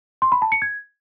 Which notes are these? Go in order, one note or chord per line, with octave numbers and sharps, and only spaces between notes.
C6
B5
A5
C#7
G#6